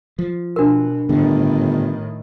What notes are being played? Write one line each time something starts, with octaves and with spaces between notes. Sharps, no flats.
F3
B2 D4 F#4 A#4
G1 A2 D3 D#3